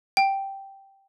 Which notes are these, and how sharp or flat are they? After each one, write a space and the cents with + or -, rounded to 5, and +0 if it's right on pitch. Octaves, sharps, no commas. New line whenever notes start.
G5 -5